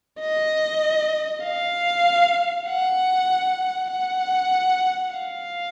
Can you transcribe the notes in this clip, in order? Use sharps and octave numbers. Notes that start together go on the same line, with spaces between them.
D#5
F5
F#5
F#5
F5